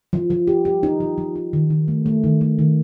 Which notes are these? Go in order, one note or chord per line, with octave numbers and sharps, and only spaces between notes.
F3
F3
G4
G4
D#4
F3
F3
D#4
D#3
D#3
A3
A3
D#3
A3
D#3